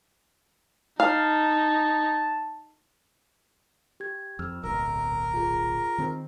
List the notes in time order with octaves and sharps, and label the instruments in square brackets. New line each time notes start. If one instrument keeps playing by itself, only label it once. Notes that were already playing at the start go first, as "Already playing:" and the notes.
[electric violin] D#4 [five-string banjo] F5 [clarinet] A5
[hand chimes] G4 G#6
[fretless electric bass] F2 [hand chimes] E6 F6
[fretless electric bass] D1 B1 [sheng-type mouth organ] A#4 [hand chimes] E6
[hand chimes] F4 G#4
[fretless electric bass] D#3 C4